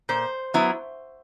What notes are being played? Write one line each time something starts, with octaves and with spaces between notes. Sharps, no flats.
A#2 C5
F#3 B3 E4